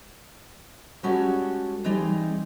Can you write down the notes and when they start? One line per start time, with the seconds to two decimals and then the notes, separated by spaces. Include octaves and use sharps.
1.03 G3 G#3 C#4 F#4 G4 A4
1.84 E3 G3 C4 D#4 G#4